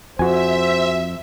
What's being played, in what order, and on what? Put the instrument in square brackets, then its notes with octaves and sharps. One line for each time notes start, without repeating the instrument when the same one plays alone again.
[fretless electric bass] F2 [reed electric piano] F#4 G#5 [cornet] C5 [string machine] E5